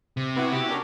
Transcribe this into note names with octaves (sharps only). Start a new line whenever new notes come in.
C3
B3 E4 F#4
G4
C#4 D4 A#4